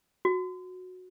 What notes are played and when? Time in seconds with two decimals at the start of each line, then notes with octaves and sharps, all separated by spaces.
0.25 F#4